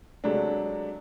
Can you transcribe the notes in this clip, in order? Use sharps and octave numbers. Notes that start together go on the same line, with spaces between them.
C3 F#3 G#3 A3 D4